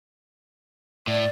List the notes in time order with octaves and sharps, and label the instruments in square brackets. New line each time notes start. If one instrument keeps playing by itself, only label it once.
[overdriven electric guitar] A2 [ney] D5